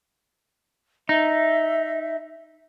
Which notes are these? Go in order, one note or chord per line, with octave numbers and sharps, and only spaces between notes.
D#4 E5